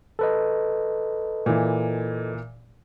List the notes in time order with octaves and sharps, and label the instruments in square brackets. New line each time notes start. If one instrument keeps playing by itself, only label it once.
[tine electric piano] A4 B4 D#5
[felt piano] A#2 E3